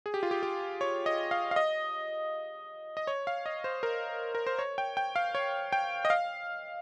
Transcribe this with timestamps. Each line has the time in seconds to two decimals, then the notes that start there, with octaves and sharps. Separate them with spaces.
0.06 G#4
0.14 G4
0.23 F4
0.31 G4
0.43 G4
0.81 C#5
1.06 D#5
1.31 F5
1.51 F5
1.56 D#5
2.97 D#5
3.07 C#5
3.27 F5
3.46 D#5
3.64 C5
3.83 A#4
4.35 A#4
4.47 C5
4.59 C#5
4.78 G5
4.97 G5
5.16 F5
5.35 C#5
5.72 G5
6.05 D#5
6.10 F5